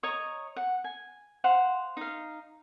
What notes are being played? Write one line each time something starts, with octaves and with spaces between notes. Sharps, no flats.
C#5 D#5 A#5 C#6
F#5
G#5
C5 F5 F#5
D#4 F5